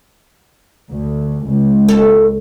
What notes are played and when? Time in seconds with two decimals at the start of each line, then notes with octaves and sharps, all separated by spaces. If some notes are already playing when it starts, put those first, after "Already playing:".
0.90 D2
1.46 C#2
1.89 D#2 A4